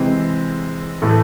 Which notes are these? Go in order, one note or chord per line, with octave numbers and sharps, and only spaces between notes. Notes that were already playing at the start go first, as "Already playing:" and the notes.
Already playing: C3 E3 G#3 C4
A2 E3 A3